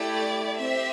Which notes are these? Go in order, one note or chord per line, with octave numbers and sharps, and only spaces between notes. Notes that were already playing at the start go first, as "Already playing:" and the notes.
Already playing: A3 E4 G4 D5
C4 G4 E5